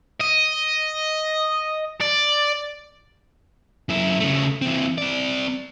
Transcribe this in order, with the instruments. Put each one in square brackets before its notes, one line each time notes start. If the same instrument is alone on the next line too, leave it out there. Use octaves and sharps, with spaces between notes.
[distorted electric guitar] D#5
D5
[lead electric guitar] F#2 E4
C#3 A3
E3 C4
C4 D5